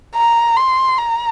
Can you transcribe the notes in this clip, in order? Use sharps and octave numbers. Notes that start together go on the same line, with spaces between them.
A#5
C6
A#5